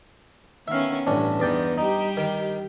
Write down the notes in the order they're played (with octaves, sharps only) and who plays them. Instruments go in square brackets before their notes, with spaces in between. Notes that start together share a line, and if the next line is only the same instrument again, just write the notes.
[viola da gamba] D#3 B3 C#4 [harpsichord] E5 F5
[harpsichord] A1 C#4 D4 [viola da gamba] G2
[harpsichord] E2 D5 G5 [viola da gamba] B3 D#4
[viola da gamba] G3 G4 [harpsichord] D#4
[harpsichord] D#3